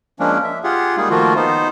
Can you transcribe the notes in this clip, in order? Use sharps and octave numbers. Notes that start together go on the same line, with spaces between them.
F3 G#3 A#3 C#4 D4
E5
F4 G4 G#4 F#5
G3 G#3 A#3 D#4 G#4
D#3 F3 A3 A#3 F4 F#4
B3 D#4 C5